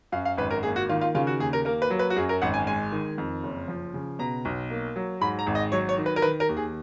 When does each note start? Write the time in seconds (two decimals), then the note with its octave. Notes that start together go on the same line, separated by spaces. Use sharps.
0.12 F#2 F5
0.25 F5
0.37 G#1 B4
0.51 A#4
0.63 A#3 G#4
0.76 F#4
0.89 D#3 F4
1.01 F4
1.15 C#3 F4
1.27 F#4
1.40 D#2 G#4
1.53 A#4
1.65 A#3 A#4
1.82 B4
1.90 F#3
1.99 B4
2.10 F#4
2.16 F#2 G#4
2.29 A#4
2.42 G#1 F#5
2.54 G#5
2.67 G#3 G#5
2.92 D#3
3.18 F2
3.43 F#1
3.68 F3
3.94 C#3
4.19 B2 A#5
4.45 B1
4.70 A#3
4.96 F#3
5.21 G#2 B5
5.39 A#5
5.47 G#1
5.55 D#5
5.72 F#3 C#5
5.89 C#5
5.98 D#3
6.06 B4
6.16 A#4
6.22 D#3 B4
6.40 A#4
6.49 D#2
6.57 G#4